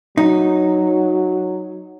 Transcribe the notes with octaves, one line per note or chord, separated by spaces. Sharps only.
F#3 D#4